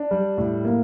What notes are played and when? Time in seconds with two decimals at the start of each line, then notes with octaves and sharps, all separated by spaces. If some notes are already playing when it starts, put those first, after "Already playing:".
Already playing: D4
0.11 G3
0.38 A2
0.65 A#3